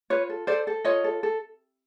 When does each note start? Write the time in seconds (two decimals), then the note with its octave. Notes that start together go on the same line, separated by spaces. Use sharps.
0.10 F4 B4 C#5
0.29 A4
0.47 A4 C5 D5
0.67 A4
0.85 F4 C#5 D#5
1.04 A4
1.23 A4